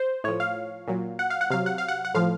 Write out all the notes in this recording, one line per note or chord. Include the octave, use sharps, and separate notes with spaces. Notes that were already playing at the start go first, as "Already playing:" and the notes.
Already playing: C5
A2 F3 C#5
F5
A#2 F#3
F#5
F5
F#5
C3 F#3 F5
F#5
F5
F#5
F#5
A2 F3 F5